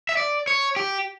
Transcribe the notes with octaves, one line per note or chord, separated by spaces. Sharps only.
E5
D5
C#5
G4